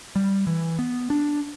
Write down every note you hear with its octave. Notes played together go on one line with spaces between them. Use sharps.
G3
E3
B3
D4